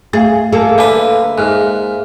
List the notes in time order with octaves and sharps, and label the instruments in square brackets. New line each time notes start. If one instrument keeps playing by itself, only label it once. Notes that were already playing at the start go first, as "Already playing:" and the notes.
[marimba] A3 E5 F5 [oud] G#4
[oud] A#3 G#4 A4
[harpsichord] D3 B4 [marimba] E5 G#5 A5
[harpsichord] G#2 [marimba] E5 F6 F#6